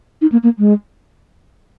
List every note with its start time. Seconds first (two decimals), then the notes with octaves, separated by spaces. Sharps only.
0.22 D#4
0.32 A#3
0.43 A#3
0.59 G#3